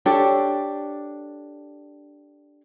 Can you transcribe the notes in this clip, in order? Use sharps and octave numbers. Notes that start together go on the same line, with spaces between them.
D4 G4 A4 C#5